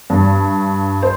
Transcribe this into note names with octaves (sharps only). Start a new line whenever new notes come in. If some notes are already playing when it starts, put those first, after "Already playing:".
G2
C5